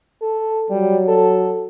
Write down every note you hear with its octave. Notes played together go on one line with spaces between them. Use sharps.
A4
F#3 G3
A4